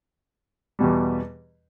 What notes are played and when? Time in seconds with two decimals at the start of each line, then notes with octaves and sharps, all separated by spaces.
0.79 E2 B2 G3